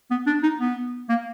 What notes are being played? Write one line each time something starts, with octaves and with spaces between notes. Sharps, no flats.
B3
D4
D#4
B3
A#3